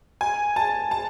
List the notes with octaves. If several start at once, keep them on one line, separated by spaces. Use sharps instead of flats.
G#5
A5
A5